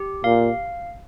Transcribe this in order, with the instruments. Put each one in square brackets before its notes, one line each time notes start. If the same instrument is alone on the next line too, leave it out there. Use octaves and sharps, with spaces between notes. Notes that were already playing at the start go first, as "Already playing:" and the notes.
Already playing: [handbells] G4
[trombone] A#2 [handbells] F5